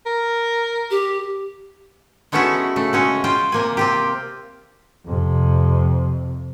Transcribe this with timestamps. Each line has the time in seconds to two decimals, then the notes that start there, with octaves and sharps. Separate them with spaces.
0.06 A#4
0.91 G4
2.32 G#3 A3 B3 C#4 E4 F#4
2.76 C#3 A3
2.93 G#3 C#4 F#4
3.24 F4 C5 G5
3.52 C3 A#3 G#5
3.77 C4 F4 G4
5.07 F2 C3